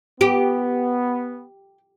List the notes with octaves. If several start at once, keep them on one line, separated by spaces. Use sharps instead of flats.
B3 G4